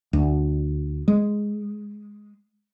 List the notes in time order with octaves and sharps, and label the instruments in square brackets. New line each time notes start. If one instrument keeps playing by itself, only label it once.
[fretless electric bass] D2
G#3